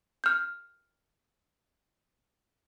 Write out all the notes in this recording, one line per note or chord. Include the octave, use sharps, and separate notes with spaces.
F6 G6